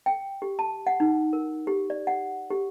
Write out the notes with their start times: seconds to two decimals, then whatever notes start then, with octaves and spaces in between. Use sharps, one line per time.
0.06 G5
0.42 G4
0.59 A5
0.87 F#5
1.00 D#4
1.33 A#4
1.67 G4
1.90 D5
2.07 F#5
2.50 G4